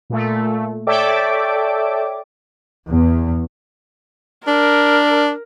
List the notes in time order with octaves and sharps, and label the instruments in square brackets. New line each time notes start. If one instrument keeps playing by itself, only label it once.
[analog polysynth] A#2 A3
A4 C#5 D5 E5 G5 D6
[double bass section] E2
[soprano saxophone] D4 [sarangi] A#4